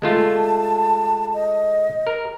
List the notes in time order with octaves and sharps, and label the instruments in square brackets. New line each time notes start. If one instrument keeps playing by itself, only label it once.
[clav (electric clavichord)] G#3 A3 F4 [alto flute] A5
[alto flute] D#5
[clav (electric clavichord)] A#4